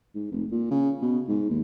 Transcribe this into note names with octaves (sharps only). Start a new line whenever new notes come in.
G#2
F1
A#2
C#3
B2
G#2
D#2